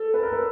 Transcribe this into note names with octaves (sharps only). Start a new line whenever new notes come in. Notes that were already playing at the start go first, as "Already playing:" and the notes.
Already playing: A4
B4
A#4
B4